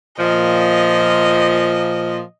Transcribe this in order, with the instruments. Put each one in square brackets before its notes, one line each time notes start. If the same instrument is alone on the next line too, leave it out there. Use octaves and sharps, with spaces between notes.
[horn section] A#2 F3 [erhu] D#5